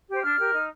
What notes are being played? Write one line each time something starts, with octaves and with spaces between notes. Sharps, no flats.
G4 C5
D4 F6
G4 A#4
D#4